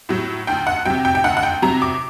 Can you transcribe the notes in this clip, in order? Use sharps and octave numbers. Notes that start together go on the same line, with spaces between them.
A2 F#3
D2 G5
F#5
C3 F#3 G5
G5
G5
D2 F#5
F#5
G5
C3 F#3 A#5
D6